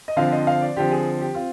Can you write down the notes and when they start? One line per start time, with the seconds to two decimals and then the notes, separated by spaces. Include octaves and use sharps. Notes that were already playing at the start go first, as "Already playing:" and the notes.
0.08 D#5
0.16 D3 F3 C4 F5
0.32 D#5
0.47 F5
0.61 D5
0.76 D3 F3 C4 G4
0.91 G#4
1.21 G4
1.35 C4 F4